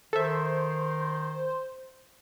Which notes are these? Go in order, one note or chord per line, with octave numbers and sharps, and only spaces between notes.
D#3 A4 C5 E5